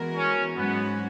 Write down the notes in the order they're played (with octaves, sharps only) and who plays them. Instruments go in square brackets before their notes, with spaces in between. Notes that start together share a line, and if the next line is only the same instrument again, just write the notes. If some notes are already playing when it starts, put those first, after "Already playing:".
Already playing: [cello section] E3 G#3 B3 F#4 A#4
[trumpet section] C#4
[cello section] G#2 F#3 C#4 F#4 [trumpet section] B3